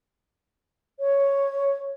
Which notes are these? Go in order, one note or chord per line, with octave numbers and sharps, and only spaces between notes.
C#5